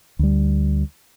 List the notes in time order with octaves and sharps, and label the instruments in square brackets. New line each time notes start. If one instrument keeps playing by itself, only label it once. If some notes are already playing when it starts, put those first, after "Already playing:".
[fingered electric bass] D2 G3